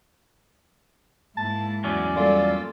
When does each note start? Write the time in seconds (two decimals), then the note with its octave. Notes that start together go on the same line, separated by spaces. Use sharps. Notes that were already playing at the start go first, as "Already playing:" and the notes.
1.37 G#2 A#3 E4 A5
1.84 E2 F#3 C#4 D5
2.16 G3 A#3 F4 A4 D5